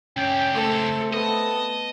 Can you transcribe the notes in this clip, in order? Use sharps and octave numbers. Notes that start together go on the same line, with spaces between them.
C#2 C#4 G4 G5
A3 C4 A4
B3 D#5 A5